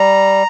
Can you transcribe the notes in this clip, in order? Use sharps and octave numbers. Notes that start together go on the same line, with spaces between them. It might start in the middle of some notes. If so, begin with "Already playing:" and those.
Already playing: G3 A#5